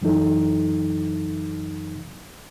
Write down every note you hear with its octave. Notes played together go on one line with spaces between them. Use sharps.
F#2 E3 F#3 D#4 A4